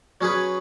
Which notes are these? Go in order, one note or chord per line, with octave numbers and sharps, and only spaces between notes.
F#3 C#4 G#4 B4